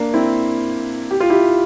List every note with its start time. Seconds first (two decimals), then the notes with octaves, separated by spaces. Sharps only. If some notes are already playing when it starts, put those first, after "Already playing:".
Already playing: A#3 D4
0.14 C4 E4
1.11 G4
1.20 F4
1.30 E4 G4